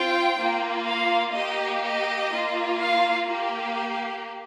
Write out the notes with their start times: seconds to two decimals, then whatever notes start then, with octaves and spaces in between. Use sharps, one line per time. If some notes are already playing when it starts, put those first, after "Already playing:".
Already playing: C4 F4 G5
0.35 A#3 F4
0.85 F5
1.33 A#3 G4 D#5
1.83 D#5
2.32 A#3 F4
2.81 F5
3.30 A#3 G4